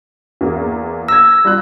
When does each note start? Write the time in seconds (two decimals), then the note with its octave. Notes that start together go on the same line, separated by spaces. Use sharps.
0.41 E2 A#3
1.08 E6 G#6 A#6
1.45 G3 F4 F#6